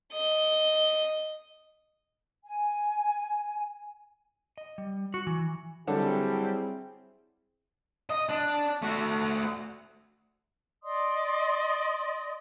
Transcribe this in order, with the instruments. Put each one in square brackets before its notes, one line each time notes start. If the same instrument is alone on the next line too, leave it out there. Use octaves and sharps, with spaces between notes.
[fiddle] D#5
[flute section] G#5
[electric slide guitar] D#5
G3
F#4
E3
[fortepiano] D3 A4 [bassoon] F#3 [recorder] G3 [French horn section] C4 E4 G#4
[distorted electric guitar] D#5
D4
A3 F#4
[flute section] D5 D#5 C6 D#6